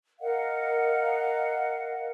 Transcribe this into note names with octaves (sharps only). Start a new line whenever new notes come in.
A#4 D#5 F5 F#5